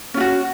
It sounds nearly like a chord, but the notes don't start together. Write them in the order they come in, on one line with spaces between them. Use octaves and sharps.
C#4 F4 F#4